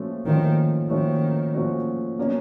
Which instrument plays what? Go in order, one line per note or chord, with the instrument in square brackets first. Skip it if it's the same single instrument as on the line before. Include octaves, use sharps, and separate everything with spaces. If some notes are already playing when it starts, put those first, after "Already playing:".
Already playing: [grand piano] A#2 F3 A3 C#4 F#4
[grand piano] A#2 F3 A3 C#4 F#4 [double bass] D#3
[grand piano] A#2 F3 A3 C#4 F#4 [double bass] D#3
[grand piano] A#2 F3 A3 C#4 F#4
B2 F#3 A#3 C#4 F#4